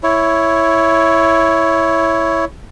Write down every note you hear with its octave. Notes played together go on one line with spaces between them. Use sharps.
E4 C#5